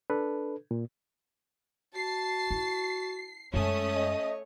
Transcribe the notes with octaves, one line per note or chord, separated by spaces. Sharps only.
D4 A4 B4
A#2
F#4 A5 C7
E4
F#2 G#3 A3 C#4 C#5 D#6
D#5